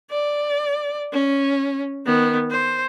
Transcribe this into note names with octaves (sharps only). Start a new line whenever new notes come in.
D5
C#4
D#3 B3
C5